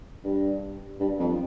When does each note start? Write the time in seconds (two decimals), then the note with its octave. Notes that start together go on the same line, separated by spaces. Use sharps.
0.24 G2
0.99 G2
1.19 F2